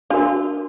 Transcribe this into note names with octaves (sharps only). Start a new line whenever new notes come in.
D4 F4 F#4 A#4